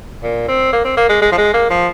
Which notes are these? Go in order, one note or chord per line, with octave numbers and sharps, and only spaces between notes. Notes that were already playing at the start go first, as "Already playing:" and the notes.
A#2
C4
A#3
C4
A#3
G#3
G#3
F3
G#3
A#3
F3